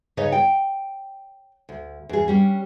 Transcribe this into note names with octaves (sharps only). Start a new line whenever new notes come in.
C#3 D#4 B4 C#5 D#5
G5
D2
E2 G#4
G3 C#4 D4